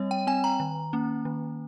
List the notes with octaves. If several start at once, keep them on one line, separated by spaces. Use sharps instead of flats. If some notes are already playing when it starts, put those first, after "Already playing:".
Already playing: G3 C4 C#5
G5
C4 G#5
A#5
D#3
A#3 C#4
D#3